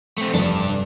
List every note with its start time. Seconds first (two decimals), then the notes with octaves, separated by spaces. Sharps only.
0.18 A3 C4
0.34 F1 G2 D4